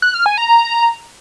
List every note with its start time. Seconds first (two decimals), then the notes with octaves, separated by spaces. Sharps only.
0.02 F#6
0.14 F6
0.26 G#5
0.38 A#5